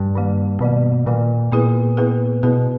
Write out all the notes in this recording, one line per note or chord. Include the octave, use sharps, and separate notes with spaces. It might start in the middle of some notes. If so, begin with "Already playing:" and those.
Already playing: G2
D#3 F#3 A#3
B2 D#3 F#3 A#3
A#2 D#3 F#3 A#3
A#2 B3 E4 G#4 B4
B3 E4 G#4 B4
B2 B3 E4 G#4 B4